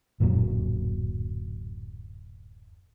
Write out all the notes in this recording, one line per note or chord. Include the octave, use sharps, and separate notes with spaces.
D1 F#2 A#2 F#3